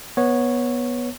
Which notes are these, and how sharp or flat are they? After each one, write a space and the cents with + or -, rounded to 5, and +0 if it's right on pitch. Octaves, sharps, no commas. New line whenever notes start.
B3 -15 C#5 -5